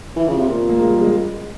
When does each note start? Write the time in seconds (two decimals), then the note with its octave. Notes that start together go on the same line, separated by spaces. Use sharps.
0.16 E3
0.27 C#3 F3
0.38 C3
0.48 A#2
0.69 A#3
0.79 G#3
0.90 G3
1.01 G#3